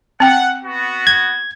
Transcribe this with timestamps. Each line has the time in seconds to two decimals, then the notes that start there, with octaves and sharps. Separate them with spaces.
0.20 C4 F#5 G5
0.64 B3 F#4
1.07 G#6